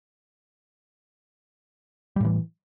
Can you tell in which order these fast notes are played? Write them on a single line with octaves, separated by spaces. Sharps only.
G3 A2 E3